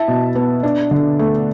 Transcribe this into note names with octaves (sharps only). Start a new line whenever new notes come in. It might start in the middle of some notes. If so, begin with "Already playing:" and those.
Already playing: E4 E5 A5
B2
B3
D4
D3
A3